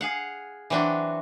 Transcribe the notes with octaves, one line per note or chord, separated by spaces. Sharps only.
G#4 F5 F#5
E3 F#3 C4 D4 F#4